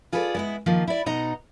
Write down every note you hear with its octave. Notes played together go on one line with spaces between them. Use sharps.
F4 G#4 A4 B4 C5 D5
G#3 B3 E4
D#3 F3 A#3 F4
E4 D5
B2 D#4 D#5 F#5 A#5